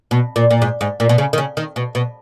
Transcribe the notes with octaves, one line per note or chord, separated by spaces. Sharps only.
B2
A#2
A#2
G#2
G#2
A#2
B2
C#3
D#3
C#3
D#3
B2
B2